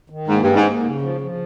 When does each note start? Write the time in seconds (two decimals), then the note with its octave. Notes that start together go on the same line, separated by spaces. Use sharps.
0.10 D#3
0.28 G#2 A#3
0.42 G2
0.47 C#4
0.56 G#2
0.65 A#3
0.83 C#3
1.01 F3
1.21 F3